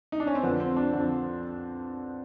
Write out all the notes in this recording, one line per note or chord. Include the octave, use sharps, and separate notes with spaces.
D#4
D4
C#4
C4
F2 D3 F3 B3
C4
D4
F2 D3 F3